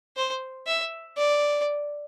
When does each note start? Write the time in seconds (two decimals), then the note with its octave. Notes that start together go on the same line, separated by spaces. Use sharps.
0.17 C5
0.67 E5
1.17 D5